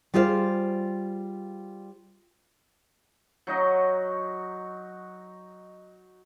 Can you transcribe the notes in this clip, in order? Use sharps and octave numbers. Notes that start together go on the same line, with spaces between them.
G3 F4 G#4 C5 E5 F5
F#3 D#4 F#4 D#5